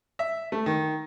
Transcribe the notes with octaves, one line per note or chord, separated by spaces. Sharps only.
E5
A3
D#3